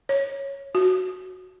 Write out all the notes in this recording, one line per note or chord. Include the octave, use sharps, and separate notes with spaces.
C#5
F#4